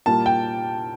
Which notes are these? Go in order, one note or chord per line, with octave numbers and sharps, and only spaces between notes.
A#2 G3 A#3 A5
G5